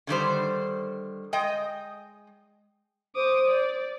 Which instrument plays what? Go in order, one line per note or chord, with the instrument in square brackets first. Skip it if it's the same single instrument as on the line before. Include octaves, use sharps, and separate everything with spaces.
[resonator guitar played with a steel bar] D3 D#3 G3 C5
G#3 D#5 G5
[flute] C5 [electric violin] D6 D#6
[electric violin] D5